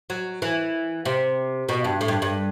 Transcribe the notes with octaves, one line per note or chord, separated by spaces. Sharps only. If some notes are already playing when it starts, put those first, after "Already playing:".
F#3
E3
C3
B2
G2
A2
G2
G2